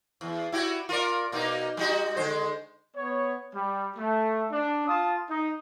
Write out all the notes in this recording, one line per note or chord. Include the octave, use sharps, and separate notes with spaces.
E2
E4 F#4 G4
F4 A#4 D5
B2 A#3 D#4
G3 D#4 F#4
D3 G#3 C5
B3 C#5
G3
A3
D4
F4 A5 D#6
D#4